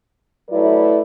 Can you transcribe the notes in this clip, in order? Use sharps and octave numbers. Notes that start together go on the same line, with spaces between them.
F#3 A3 E4 B4 D5